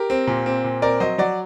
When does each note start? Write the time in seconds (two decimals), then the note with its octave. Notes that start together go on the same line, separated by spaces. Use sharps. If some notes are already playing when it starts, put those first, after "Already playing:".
Already playing: G4 A#4
0.10 C4
0.27 A#2
0.46 C4
0.64 A#2
0.82 C4 A#4 D5
1.00 F#3 C5 D#5
1.18 F#3 D5 F#5